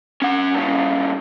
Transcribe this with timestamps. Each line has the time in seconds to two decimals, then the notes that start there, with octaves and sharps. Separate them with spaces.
0.22 C#4 F#5
0.54 G2 C#3